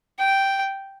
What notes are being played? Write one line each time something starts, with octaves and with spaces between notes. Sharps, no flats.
G5